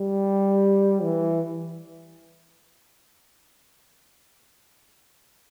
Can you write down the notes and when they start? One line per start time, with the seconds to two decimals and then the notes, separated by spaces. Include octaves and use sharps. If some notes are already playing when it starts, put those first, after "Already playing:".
Already playing: G3
1.02 E3